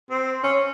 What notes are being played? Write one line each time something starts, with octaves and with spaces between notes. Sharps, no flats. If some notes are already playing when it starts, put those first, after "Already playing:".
C4
C#4